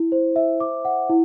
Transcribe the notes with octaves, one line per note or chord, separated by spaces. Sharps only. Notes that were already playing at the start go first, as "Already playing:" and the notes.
Already playing: E4
C5
E5
D6
F#5
E4